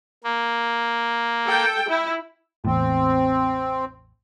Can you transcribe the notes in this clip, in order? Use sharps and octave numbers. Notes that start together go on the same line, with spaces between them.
A#3
A4 G5
E4
A1 E2 A2 C4